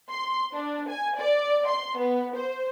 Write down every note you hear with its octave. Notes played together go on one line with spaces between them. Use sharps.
C6
D4
G#5
D5
C6
B3
C5